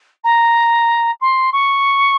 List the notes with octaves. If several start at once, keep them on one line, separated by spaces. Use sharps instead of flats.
A#5
C6
C#6